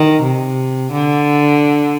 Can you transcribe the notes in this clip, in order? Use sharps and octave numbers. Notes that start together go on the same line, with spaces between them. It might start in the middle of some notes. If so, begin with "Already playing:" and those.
Already playing: D#3
C3
D3